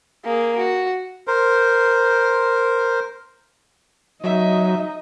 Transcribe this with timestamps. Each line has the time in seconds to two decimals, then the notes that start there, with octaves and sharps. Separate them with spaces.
0.25 A#3 G#4
0.58 F#4
1.27 A#4 C5
4.24 F#3 D#4 D#5 E5